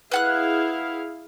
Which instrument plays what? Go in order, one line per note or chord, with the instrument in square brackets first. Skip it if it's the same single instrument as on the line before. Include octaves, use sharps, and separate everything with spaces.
[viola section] E4 G#4 F5 [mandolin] B4 F#5 F#6